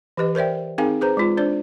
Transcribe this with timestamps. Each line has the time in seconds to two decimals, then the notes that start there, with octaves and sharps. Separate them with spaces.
0.17 E3 G4 B4 D#5
0.35 A#4 C5 D5 E5 G5
0.78 C4 D#4 G#4 A#4 F5 G#5
1.01 G#4 B4 C5 A#5
1.17 G#3 F4
1.37 D4 C5 D5